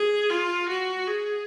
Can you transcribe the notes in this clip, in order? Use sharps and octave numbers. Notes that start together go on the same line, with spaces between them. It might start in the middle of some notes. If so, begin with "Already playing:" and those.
Already playing: G#4
F4
F#4
G#4